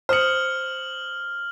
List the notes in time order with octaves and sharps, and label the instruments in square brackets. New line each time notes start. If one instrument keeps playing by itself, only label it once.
[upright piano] C5 D#6 C#7 [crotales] F6 F#7